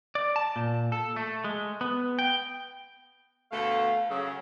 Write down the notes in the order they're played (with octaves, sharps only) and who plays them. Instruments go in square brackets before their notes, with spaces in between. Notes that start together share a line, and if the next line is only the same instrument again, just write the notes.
[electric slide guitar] D5
A5
A#2
A4
A3
G#3
B3
G5
[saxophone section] D2 B2 A3 [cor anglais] F5
[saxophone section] C#3 [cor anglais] F#3